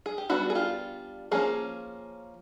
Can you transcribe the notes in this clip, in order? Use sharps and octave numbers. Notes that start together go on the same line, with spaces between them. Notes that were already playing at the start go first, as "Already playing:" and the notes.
G#4
G4
G3 B3 D4 E4 F#4
G#4
F4 G4
F3 A#3 C#4 F#4 G#4